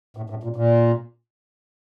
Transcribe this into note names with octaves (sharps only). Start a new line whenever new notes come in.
A2
A2
A#2
A#2